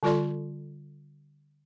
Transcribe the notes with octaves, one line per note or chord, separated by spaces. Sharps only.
D3 G3 F4 A4 D5 C6